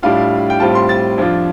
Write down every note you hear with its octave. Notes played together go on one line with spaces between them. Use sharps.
A2 G3 D4 F4 F5
G5
A2 G3 C4 F4 A5
C6
A6
F2 F3 D4 F4